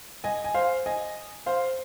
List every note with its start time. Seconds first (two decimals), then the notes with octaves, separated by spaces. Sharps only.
0.24 D#5 G#5
0.44 G#5
0.54 C5 F5
0.86 D#5 G#5
1.46 C5 F5